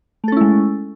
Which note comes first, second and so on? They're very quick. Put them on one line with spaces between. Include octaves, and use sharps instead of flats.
A3 A4 C#4 E4 G#3